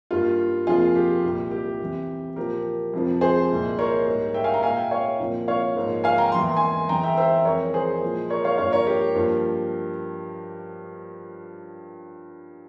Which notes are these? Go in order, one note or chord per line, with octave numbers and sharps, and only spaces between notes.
G2 G3 A#3 F4
F2 C3 F3 A#3 F4 G#4
G4
C2 A#2 G3
G4
E2 C3 E3
A#2 F3 A#3 G4 A#4
F2 C3 F3
G#4 C5
C2 A#2 G#3
A#4 C#5
G#2 G3 A#3
E5 G5
F5 G#5
G5 A#5
A#2 G#3 F5 G#5
E5 G5
C#5 F5
C2 A#2 F3 A#3
C#5 F5
G#2 F3 A#3
F5 G#5
G5 A#5
E2 E3 A#3 C6
G#5 C6
E2 E3 G#3 G5 A#5
E5 G5
C5 E5
F2 E3 G#3 A#4 C#5
G#4 C5
A#2 F3 G#3
A#4 C#5
C#5 F5
G2 F3 A#3 C#5 F5
A#4 C#5
G4
G2 F3 A#3